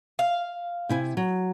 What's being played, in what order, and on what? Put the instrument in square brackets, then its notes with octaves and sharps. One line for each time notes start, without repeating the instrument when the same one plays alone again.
[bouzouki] F5
[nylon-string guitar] C3 E4 G#5
F#3